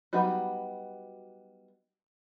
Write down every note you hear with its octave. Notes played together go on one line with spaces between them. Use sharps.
F#3 G3 B3 D#4 F#4